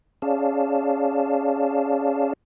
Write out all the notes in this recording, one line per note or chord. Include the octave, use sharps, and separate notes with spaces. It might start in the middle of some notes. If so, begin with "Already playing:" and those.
C#4 G#4 C#5 D5 F5 A5